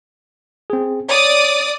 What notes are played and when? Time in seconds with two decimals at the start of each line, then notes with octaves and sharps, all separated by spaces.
0.70 C4 G#4
1.09 C#5 D5 D#6